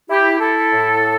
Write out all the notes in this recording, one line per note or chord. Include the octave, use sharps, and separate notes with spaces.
E4 G4
E4 A4
A2